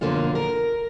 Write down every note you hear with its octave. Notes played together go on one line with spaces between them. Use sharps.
F#2 B2 D3 F3 A#3 F4
A#4